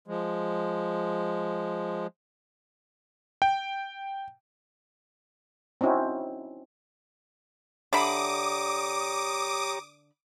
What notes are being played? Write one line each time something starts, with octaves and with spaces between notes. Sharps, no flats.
F3 G#3
G5
C4 C#4 D#4 E4 F#4
D3 G4 C#5 E5 A#5 B5 D6 D#6